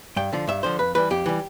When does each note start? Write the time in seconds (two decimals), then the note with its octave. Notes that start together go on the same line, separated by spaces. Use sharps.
0.16 G2 G5
0.32 D3 F3
0.48 G2 E5
0.63 D3 F3 C5
0.79 F2 B4
0.95 E3 G3 B4
1.10 F2 G4
1.26 E3 G3